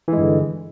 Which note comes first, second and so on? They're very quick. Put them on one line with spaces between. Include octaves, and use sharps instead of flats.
E3 G#3 G2 D3